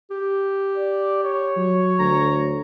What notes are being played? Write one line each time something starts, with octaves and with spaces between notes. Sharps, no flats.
G4
D5
C#5
F#3
D2 A#5